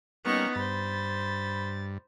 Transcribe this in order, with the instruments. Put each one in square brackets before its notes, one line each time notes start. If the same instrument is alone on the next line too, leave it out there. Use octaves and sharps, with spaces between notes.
[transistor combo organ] G3 A#3 F6 [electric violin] B3 C#4 [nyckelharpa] D#4 C#6
[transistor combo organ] G2 [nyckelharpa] C5 B5 [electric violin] A6